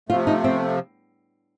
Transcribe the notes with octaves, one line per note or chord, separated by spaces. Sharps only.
C3 F3 A3 F4
D#4
C4